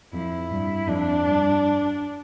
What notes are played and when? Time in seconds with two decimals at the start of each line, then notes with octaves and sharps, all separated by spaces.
0.13 F2 E4
0.51 G2
0.87 F2 D4
1.25 G2